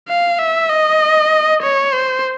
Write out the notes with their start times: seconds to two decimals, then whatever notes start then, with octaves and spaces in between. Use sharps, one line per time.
0.08 F5
0.38 E5
0.70 D#5
1.63 C#5
1.94 C5